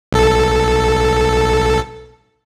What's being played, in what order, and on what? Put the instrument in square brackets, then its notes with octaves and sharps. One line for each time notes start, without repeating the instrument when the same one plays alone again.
[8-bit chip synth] B1 A4